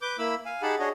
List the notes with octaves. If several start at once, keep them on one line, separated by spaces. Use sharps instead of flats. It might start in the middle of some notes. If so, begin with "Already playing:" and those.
B4 D6 G6
A#3 E4 B5 E6
F5 G#5
D#4 G4 G#4 F#5 A5 B5
D4 F#4 G#4 C#5 D#5